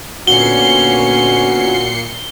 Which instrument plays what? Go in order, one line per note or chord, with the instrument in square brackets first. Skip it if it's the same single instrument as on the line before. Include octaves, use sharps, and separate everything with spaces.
[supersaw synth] A#2 C7 C#7 [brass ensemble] D3 B3 C#4 [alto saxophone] F#4 [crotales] G7